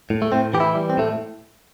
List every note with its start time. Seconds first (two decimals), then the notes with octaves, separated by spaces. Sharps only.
0.10 A2
0.22 A3
0.32 A2 C4
0.54 E3 G4
0.60 E4
0.75 G3
0.90 C4
0.97 A2 A3